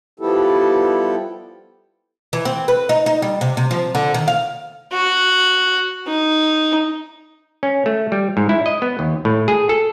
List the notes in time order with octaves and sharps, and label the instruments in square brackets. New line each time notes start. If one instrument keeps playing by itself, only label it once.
[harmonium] F3 G3 B3 E4 G4 A4
[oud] E3
C4
B4
D#4
D#4
G3
C3
C3
F3
D3
D#3
F5
[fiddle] F#4
D#4
[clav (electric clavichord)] C#4
A3
G3
G#2
E4
D#5
B3
D#2
A2
G#4
A4